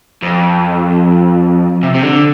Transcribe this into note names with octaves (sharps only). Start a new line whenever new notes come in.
F2
C3
C3
D3